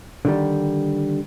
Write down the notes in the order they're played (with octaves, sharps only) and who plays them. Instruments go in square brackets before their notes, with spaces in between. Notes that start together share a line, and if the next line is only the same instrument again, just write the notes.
[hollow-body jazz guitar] D3 D#3 G3